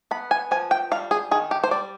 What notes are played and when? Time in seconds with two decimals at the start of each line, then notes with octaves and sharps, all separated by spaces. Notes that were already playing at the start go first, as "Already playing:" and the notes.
0.11 B3 B5
0.31 G#5
0.51 F3 G#5
0.71 G5
0.91 G3 F5
1.11 G#4
1.31 D#3 G#4
1.51 G4
1.64 C5
1.71 G3 D5